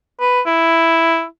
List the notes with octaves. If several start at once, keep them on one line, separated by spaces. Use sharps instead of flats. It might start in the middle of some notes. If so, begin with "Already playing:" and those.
B4
E4